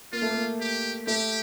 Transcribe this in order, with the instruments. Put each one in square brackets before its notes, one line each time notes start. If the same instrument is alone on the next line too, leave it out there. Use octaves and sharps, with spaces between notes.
[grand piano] A#3 [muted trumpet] F4
[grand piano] A3
A#3
[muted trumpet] G4
[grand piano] A3 [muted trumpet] G4